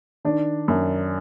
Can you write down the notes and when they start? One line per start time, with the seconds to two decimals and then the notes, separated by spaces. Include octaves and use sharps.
0.25 D#3 D4
0.68 F#2